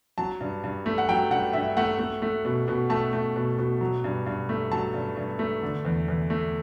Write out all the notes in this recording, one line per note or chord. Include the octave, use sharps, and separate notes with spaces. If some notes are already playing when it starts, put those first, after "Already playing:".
F#3 A5
G2
G2
A3
F#5
F#3 G5
G2 F#5
G2 E5
A3 F#5
A3
A3
B2
B2
A3 A5
A3
B2
B2
F#3
G2
G2
A3
F#3 A5
G2
G2
A3
D3
E2
E2
A3